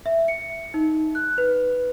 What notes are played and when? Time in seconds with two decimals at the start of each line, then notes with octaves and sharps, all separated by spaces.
0.06 E5
0.28 C#7
0.74 D#4
1.15 F#6
1.38 B4